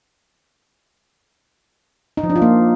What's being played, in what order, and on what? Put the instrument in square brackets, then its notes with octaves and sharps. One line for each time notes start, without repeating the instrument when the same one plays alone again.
[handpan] D#4
F3
D4
F4
A#3